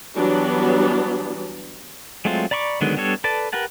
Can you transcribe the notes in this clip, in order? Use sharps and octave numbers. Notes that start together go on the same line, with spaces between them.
E3 F#3 G3 B3 D4
F#3 G#3 A3 C4 F4
D5 A#5 B5 C#6 D6
D3 D#3 F#3 G#3 B3
G3 B3 D4 A4 C#5
A4 B4 D5 A5
G4 A#4 B4 F#5 A5